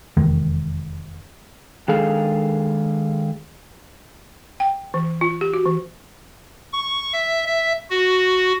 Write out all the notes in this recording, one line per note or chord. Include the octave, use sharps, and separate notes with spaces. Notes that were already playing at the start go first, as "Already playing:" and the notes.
F1 E2 D#3 G#3
D#3 G#3 D4 G#4 A4 F5
G5
E3
F4
G4
F#4
E3
C#6
E5
E5
F#4